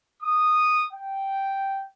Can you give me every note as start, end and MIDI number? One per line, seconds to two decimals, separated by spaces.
0.23 0.86 87
0.93 1.85 79